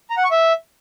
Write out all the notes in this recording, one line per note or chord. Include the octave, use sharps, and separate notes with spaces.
A#5
F#5
C#6
E5